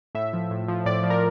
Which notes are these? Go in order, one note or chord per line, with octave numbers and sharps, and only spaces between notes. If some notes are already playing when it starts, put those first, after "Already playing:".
A2 E5
F3
A2
F3
A2 D5
F3
A#4